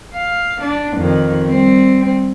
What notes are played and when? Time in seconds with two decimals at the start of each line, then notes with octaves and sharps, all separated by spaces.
0.14 F5
0.61 D4
0.96 F2 D#3
1.48 G3 C4